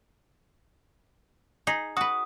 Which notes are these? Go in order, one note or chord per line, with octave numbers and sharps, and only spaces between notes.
D#4 G#4
F#4 B4 D#6